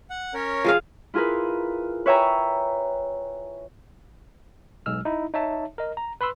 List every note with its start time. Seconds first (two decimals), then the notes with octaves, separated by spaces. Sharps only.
0.10 F#5
0.34 C#4 A#4 C#5
0.65 F3 G#4 F5
1.14 E4 F4 G#4 A#4 B4
2.06 B4 C#5 E5 G5 G#5 A#5
4.86 B1 G#3 E6 F6
5.05 D#4 E4
5.34 D#4 C#5 E5 A5
5.78 A#4 D#5
5.97 A#5
6.21 B4 B5 C6 E6